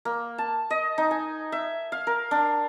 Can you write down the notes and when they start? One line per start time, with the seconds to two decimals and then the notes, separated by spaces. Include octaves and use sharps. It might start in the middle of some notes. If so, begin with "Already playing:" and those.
0.05 A#3
0.38 A5
0.70 D#5
0.98 D#4
1.11 G#5
1.52 E5
1.92 F5
2.07 A#4
2.31 D4